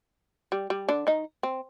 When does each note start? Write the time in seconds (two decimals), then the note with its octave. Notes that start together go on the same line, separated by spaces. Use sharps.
0.52 G3
0.70 G3
0.89 D3 D4
1.07 D#3 D#4
1.43 C4